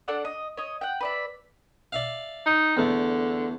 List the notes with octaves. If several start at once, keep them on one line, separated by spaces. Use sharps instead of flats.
D4 A4 D5 F#5
D#5
C#5 D#5
F#5 G5
B4 D5 E5
D5 E5 F5
D#4
E2 D3 A3